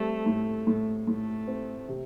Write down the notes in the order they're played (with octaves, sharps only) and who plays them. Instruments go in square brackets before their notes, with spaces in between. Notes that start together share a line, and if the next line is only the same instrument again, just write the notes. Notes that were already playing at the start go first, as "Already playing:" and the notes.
Already playing: [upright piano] G3 C4 [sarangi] A3
[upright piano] A2
A2
[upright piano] A2 [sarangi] A3
[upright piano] C4
C3